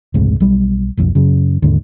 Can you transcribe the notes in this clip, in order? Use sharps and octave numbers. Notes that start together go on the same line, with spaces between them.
F1 C#2 G#2 C3
B1 G3
F1 B1 F2
F#2 C#3
D#2 G#2 D3